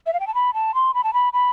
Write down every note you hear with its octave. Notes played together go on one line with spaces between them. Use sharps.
E5
F5
G5
A5
B5
A5
C6
B5
A5
B5
B5